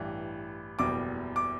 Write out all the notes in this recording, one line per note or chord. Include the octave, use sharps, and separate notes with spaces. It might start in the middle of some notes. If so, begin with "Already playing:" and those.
Already playing: A1 G2 E3
F#1 E2 B2 G3 D6
D6